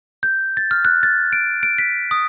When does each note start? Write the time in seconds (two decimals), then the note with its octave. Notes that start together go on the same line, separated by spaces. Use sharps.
0.23 G6
0.57 A6
0.71 F6
0.85 F#6
1.03 A6
1.33 D7
1.63 D7
1.78 B6
2.11 D#6